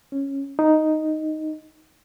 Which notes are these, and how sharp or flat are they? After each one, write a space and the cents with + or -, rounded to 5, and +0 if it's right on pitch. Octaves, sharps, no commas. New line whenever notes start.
C#4 -10
D#4 +0